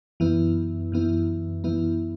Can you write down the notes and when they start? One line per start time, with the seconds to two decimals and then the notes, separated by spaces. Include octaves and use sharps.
0.20 F#2 E3 B3 E4
0.92 F#2 E3 B3 E4
1.64 F#2 E3 B3 E4